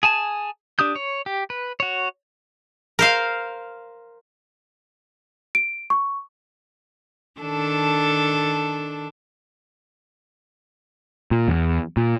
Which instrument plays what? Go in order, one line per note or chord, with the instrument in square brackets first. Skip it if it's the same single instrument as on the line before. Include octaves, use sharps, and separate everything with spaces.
[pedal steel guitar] G#4 G#5 A5
D4 G4 D#6 G6
C#5
G4
B4
F#4 C#5
[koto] A#4 C5 F5
[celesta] D7
C#6
[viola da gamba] D#3 D4 A4
[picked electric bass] A#2
E2
A#2